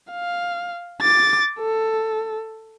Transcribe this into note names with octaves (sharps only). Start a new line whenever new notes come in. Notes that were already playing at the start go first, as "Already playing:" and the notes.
F5
D6 A6
A4